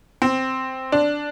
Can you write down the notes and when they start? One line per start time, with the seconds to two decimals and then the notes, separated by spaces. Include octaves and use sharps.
0.22 C4
0.92 D4